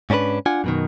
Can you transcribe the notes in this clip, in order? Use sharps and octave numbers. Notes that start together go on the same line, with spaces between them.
G#2 C#4 D4 A4 B4
D4 F4 F#5 G#5
F#2 B2 D#3